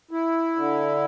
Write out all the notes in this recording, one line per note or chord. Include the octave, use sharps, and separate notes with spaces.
E4
D3